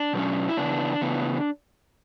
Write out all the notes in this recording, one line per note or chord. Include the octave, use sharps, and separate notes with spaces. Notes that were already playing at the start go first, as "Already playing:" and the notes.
Already playing: D4
B2 F#3 C#4
E4
C#3 E3 B3 D4
C#3 E3 B3